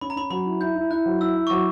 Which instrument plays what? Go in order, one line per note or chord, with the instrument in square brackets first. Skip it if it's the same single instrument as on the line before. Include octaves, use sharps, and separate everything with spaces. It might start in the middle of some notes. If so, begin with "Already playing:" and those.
[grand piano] C#4 [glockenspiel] B5
[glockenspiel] A#5
[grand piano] C#4 [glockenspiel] B5
[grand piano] F#3 [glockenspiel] B5
[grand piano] E4
[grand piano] E4 [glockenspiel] G6
[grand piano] E4
[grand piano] E4 [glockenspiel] F#6
[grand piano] F#3
[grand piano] E4 [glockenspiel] E6
[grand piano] E4
[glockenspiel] C#6
[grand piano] F#3 [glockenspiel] D6